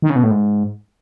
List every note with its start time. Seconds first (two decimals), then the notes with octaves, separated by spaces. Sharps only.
0.02 D#3
0.10 C#3
0.16 B2
0.23 A2
0.31 G#2